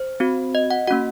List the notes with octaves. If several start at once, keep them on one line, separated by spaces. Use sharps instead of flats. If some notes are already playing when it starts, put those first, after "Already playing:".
Already playing: C5
C4 F#4
D#5
F#5
A#3 C#4 F#4 F#5